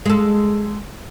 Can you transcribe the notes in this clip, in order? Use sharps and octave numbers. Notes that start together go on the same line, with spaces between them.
G#3 A4